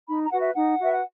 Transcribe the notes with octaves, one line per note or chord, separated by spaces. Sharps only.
D#4 B5
A#5
F#4 B4 F#5
E5
D#4 F#5
F#4 B4 E5
F#5